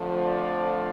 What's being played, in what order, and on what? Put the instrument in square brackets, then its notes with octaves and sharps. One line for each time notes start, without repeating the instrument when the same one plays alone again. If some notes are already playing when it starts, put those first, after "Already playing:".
Already playing: [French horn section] F2 D3 F3 A3
D5